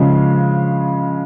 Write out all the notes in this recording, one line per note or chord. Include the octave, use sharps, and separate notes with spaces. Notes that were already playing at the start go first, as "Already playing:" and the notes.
Already playing: C#3 F3 G#3